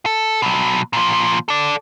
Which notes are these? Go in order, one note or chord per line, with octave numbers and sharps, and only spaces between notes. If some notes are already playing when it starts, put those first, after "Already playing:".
A4
B2 F#3
A#2 F3
A4 D5